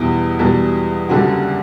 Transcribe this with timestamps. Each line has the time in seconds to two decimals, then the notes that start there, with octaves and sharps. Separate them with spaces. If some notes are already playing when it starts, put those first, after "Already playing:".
Already playing: E2 B2 G3 E4
0.39 E2 B2 G3
1.09 F#1 F#2 D3 G3 F#4